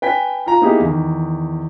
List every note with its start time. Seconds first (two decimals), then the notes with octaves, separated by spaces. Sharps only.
0.02 B4 G5 G#5 B6
0.46 F4 A#5
0.61 A#3 B3 D#4 E4 G4 G#4
0.80 E2 D#3